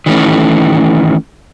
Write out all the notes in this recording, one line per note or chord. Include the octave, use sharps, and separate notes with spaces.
D#3 E3 A3 C#4